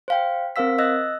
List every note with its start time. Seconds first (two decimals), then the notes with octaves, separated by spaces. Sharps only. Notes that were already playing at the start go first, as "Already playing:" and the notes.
0.08 C5 F5 G5
0.56 C4 A#4 C5 F5 E6 B6
0.78 D#5 E6 F#6 A#6